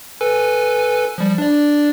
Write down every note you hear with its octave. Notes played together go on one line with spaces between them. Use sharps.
A4 B4 G#5
F3 G3
D4 D5